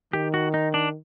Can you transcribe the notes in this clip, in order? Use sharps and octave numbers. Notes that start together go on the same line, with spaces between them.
D#3 G4
F#4
D#4
D4